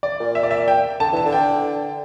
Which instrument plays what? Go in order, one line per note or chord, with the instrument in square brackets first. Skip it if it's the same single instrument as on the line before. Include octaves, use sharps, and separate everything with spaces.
[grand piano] D5
[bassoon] A#2
[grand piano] E5
D5
E5
G5
[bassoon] D3 [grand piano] A5
[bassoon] E3 [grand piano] A5
[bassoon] D3
[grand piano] G5